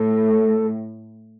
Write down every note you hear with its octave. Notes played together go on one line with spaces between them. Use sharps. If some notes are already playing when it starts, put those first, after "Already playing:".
Already playing: A2 A4